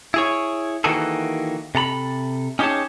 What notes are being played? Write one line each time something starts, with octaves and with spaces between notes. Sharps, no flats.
E4 G#4 C#5
D#3 E3 A#3 F#4 G#4 A4
C3 A4 A#5 B5
C#4 D#4 G4 G#4 C#5 A5